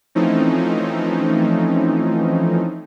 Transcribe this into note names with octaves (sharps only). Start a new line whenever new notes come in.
E3 F3 A3 C4 C#4 D#4